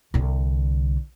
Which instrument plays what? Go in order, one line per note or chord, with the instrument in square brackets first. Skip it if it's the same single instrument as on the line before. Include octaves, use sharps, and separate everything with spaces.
[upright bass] C2 D3